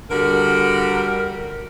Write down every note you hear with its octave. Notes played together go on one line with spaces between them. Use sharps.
D3 G3 F#4 A#4